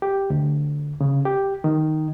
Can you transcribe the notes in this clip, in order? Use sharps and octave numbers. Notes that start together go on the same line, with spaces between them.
G4
D2
C#3
G4
D#3